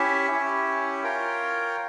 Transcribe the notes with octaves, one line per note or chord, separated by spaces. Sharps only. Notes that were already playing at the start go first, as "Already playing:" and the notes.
Already playing: C#4 E4 G4 C#5 E5
C#4 E4 G4 C#5
F4 A#4 C#5 G5